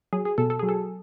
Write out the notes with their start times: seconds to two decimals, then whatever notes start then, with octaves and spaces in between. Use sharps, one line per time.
0.13 F#3 G#4
0.25 G#4
0.38 B2 A4
0.50 A4
0.59 F#3 G#4
0.69 A4